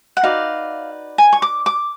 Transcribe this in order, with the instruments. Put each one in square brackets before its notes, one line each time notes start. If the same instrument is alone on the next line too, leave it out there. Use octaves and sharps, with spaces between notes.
[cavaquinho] F#5
D#4 F#4 B4 D5 F5
G#5
C#6
D6
D6